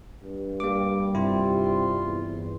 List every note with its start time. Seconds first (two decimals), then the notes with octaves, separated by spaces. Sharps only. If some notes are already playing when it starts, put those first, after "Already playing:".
0.24 G2
0.60 G3 A#3 D6
1.15 G2 C3 E4 F4
2.03 E2